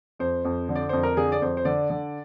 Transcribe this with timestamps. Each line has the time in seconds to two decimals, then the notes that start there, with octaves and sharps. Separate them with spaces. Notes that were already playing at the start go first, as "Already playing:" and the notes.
0.19 F2 C5
0.45 F2
0.69 D3
0.76 D5
0.89 F2 C5
1.03 A#4
1.17 D3 G#4
1.32 D5
1.42 F2 C5
1.57 C5
1.65 D3 D5
1.90 D3